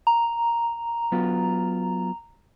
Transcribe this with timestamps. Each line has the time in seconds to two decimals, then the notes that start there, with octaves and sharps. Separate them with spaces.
0.07 A#5
1.12 F#3 B3 F4